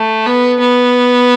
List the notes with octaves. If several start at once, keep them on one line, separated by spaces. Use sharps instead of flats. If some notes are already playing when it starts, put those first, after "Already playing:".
Already playing: A3
B3
B3